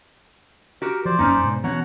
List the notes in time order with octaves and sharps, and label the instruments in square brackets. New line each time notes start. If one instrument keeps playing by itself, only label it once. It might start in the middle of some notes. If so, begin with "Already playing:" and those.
[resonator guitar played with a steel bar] F#4 G4 [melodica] A#4
[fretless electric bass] F3 [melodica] C5 D5
[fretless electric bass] F1 F#2 A#3 [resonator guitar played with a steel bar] C#4 D#4
[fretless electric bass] G#2 B2
[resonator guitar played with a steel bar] B2 [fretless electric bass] E3 B3 C#4 [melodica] C#5 F#5 A#5